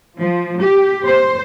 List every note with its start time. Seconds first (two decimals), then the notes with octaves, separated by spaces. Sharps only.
0.19 F3
0.61 G4
1.06 C5